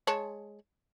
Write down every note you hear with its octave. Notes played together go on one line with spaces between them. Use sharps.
G#3 C#5 A5